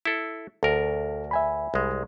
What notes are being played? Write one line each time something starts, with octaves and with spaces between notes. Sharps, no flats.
E4 A4
D2 A4 A#4 D5
E5 G#5 B5
C2 G#3